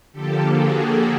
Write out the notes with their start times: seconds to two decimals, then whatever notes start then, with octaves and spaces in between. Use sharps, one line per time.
0.13 D3 F3 A#3 G4 A4
0.53 F#4 G#4